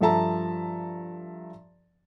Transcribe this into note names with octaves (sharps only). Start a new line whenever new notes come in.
G2 F3 A4 E5 A5 A#5